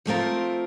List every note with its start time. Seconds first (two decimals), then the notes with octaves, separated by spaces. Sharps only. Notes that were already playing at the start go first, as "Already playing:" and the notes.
0.06 F3 A3 C4 F4 A#4